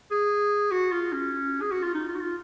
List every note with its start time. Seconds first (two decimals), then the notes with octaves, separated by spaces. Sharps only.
0.11 G#4
0.71 F#4
0.92 F4
1.12 C#4
1.61 G#4
1.72 F#4
1.83 F4
1.94 D#4
2.08 F4
2.15 F#4
2.21 F4